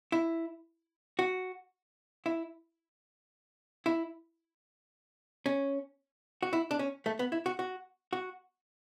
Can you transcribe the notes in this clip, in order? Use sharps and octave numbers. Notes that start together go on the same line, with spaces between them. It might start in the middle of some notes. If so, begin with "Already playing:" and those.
E4
F#4
E4
E4
C#4
F#4
E4
D4
C#4
A3
B3
E4
F#4
F#4
F#4